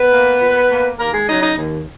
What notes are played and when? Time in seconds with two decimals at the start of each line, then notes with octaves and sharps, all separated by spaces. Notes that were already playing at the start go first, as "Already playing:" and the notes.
Already playing: B3 B4
0.12 A#3
0.40 A#2
0.69 A#3
0.98 D#2 A#3 A#4
1.13 G#3 G#4
1.27 C#3 F#3 D#4 D#5
1.42 D#4 D#5
1.57 D#2